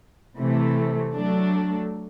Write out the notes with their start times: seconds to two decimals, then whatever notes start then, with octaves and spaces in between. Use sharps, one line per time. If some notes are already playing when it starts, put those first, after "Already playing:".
0.38 C3 E3 A3
1.13 F#3 A3 D4